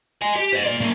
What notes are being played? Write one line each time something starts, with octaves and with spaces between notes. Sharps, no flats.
D#5 G#5
G4
C5 D#5
A#2 D5
F#3 A#3